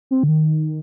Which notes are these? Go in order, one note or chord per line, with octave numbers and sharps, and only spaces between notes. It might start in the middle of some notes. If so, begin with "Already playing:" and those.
C4
D3
D#3